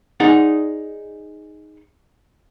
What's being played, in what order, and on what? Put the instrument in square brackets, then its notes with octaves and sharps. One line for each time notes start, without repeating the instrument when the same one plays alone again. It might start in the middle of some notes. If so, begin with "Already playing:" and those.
[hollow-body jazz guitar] D#4 G#4 D5 F#5